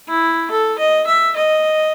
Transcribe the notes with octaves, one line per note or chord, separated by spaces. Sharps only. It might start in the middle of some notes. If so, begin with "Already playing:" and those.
E4
A4
D#5
E5
D#5